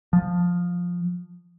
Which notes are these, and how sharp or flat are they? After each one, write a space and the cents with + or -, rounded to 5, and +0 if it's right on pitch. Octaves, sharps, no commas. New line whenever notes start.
F3 +10